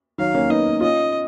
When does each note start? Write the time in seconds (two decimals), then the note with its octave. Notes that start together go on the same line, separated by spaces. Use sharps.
0.18 D#3 F#3 F5
0.34 A#3 C#4
0.50 B3 D#4 D#5
0.81 C#4 F4 D#5